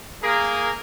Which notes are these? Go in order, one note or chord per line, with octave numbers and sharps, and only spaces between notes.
A#3 G#4 A#4